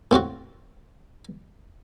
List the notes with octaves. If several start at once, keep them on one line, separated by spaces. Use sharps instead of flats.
A2 C4 F4 F#4